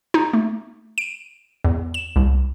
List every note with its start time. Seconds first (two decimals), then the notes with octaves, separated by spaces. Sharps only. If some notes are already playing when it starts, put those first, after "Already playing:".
0.14 D#4
0.33 A3
0.98 D7
1.64 E2
1.94 E7
2.16 C2